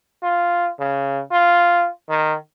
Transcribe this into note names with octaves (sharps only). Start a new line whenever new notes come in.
F4
C#3
F4
D#3